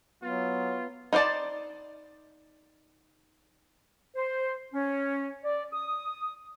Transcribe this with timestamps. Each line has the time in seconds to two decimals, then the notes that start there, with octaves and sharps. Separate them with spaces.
0.23 F#3 B3 F4
1.13 D#4 F4 C5 D5 A5
4.15 C5
4.74 C#4
5.45 D5
5.73 D#6